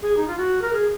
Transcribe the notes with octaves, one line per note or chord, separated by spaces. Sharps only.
G#4
D#4
F4
F#4
A#4
G#4